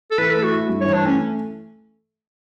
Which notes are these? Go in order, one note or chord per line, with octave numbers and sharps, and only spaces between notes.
A4
E3 B4
A3 A4
F#4
E4
G2
E3 C#5
D4
A3 C#4